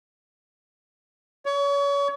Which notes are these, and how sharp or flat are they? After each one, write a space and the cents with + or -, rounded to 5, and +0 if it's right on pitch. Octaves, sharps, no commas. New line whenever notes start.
C#5 +30